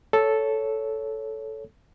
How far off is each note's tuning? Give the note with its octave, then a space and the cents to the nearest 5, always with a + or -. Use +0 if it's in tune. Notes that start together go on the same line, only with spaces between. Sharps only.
A4 -5 C#5 +10